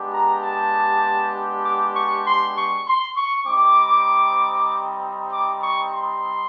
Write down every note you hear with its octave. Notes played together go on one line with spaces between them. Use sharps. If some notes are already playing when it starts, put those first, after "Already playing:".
Already playing: G#3 B3 D4 G4
A#5
A5
D6
C#6
C6
C#6
C6
C#6
G3 C4 D#4 D6
D6
C#6
C6